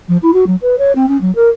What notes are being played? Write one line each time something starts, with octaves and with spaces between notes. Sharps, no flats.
F3
E4
F#4
F#3
B4
C#5
C4
C#4
F#3
A#4